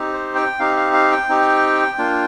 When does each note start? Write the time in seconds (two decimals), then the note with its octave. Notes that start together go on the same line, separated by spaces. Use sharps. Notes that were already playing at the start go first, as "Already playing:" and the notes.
Already playing: C4 D#4 G4
0.13 C5
0.35 G5
0.59 C4 D#4 G4 F5
0.76 F5
0.93 F5
1.11 G5
1.29 C4 D#4 G4
1.98 A#3 D4 F4